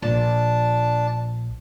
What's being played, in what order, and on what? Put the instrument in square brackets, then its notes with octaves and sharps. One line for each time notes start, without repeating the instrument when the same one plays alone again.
[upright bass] A#1 [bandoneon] D4 A5